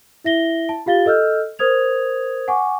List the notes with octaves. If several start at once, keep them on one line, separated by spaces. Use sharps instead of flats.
E4 E5 A#6 G7
A5
F4 G4 F5 A6 G7
A4 D#5 E6 F6 G6
A#4 C5 D#6 G#6 F7
F#5 G#5 C#6 D6